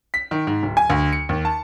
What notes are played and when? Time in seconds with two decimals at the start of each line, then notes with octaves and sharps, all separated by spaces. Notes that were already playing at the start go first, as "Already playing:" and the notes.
0.14 B6
0.31 D#3
0.47 G#2
0.63 D1
0.77 G#5
0.90 D2
1.13 C#7
1.29 D#2
1.45 A5